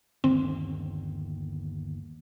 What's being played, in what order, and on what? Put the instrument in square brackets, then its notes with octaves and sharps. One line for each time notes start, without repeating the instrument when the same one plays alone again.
[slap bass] G1 D#2 D3 [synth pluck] C4